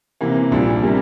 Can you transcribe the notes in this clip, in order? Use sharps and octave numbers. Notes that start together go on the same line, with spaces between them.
C3 E3 A#3
A#1 A#2 G3 D4
C3 G3 A#3